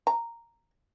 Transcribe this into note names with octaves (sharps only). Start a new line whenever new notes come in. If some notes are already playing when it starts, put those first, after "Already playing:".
A#5